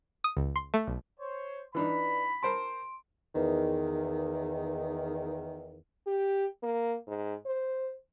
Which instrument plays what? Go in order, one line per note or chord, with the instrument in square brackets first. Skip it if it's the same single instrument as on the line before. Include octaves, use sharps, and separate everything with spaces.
[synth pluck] D#6
C#2
C6
A3
B1
[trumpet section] C5 C#5
[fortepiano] E3 D4 D#4 [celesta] B4 D5 [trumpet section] B5
[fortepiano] A#4 C5 A5 [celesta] C6 D7
[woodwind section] E2 D#3
[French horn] G4
A#3
G#2
C5